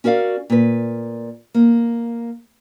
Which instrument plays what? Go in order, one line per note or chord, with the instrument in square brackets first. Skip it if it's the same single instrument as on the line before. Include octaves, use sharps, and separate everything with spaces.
[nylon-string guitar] C#4 F#4 A#4 D5 F5
A#2 B4
A#3